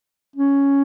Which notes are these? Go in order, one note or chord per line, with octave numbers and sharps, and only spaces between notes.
C#4